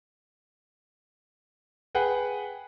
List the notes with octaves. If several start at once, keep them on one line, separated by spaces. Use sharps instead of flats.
G#4 B4 F#5 G5